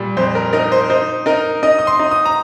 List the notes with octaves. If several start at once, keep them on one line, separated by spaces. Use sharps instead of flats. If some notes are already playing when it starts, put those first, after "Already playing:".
Already playing: A#2 G3
F2 C5
A#4
D#4 A#4
C5
D#4 C5
D#4 A#4
D#4 D#5
D#6
C6
D#4
D#6
A#5